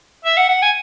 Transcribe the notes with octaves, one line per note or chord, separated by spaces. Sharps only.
E5
F#5
F#5
G#5